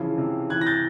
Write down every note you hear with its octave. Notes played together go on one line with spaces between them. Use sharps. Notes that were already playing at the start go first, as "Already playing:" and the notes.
Already playing: C#3 E3 F3
C3
E3 F#6 G#6
A#6
G6 A6